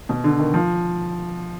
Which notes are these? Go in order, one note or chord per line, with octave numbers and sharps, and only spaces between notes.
B2
D3
D#3
F3